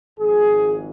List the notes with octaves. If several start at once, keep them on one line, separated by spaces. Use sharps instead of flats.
G#1 G#2 F3 G#4